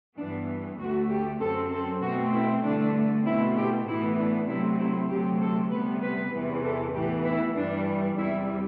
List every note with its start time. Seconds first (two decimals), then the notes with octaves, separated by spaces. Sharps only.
0.17 G2 E3 B3 D4
0.79 D2 D3 A3 F#4
1.10 G4
1.41 F#2 F#3 C4 A4
1.72 A4
2.02 B2 A3 C4 F#4
2.33 E4
2.64 G2 D3 A3 D4
3.26 B2 A3 C4 E4
3.56 G4
3.87 A2 E3 B3 E4
4.19 D4
4.48 C3 F#3 A3 C4 E4
4.80 E4
5.10 D2 C3 F#3 A3 C4 G4
5.41 A4
5.71 C3 G3 B3 B4
6.02 B4
6.33 E2 C3 E3
6.65 A4
6.95 A2 E3 B3 G4
7.26 E4
7.56 G2 E3 G3 D4
8.18 E2 C3 G3 E4